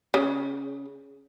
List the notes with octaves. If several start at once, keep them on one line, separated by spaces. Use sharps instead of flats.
C#3